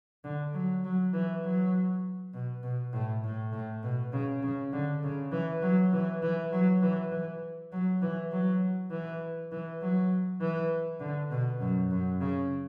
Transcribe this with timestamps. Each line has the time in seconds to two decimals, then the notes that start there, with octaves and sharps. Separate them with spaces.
0.24 D3
0.54 F#3
0.84 F#3
1.14 E3
1.44 F#3
2.34 B2
2.63 B2
2.93 A2
3.24 A2
3.53 A2
3.83 B2
4.13 C#3
4.43 C#3
4.73 D3
5.03 C#3
5.32 E3
5.62 F#3
5.93 E3
6.22 E3
6.52 F#3
6.82 E3
7.11 E3
7.72 F#3
8.02 E3
8.31 F#3
8.91 E3
9.52 E3
9.81 F#3
10.41 E3
11.00 D3
11.31 B2
11.60 F#2
11.91 F#2
12.21 C#3